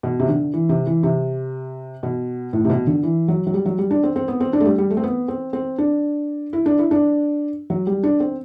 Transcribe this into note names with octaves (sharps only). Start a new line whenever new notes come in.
B2
C3
D3
E3
C3
E3
C3
B2
A2
C3
B2
D3
E3
F#3
F#3
G3
F#3
G3
D4
C4
C4
B3
C4
D4
A3
G3
G3
A3
C4
B3
C4
C4
D4
E4
D4
E4
D4
F#3
G3
D4
C4